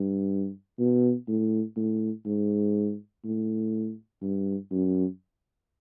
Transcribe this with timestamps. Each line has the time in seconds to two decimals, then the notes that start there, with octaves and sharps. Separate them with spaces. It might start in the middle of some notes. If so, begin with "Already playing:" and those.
Already playing: G2
0.79 B2
1.28 A2
1.76 A2
2.26 G#2
3.24 A2
4.21 G2
4.71 F#2